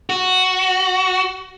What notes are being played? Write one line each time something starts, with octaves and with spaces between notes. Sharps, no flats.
F#4